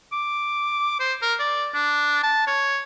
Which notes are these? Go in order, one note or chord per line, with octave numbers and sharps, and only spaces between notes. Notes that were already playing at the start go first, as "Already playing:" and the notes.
D6
C5
A#4
D5
D4
A5
C#5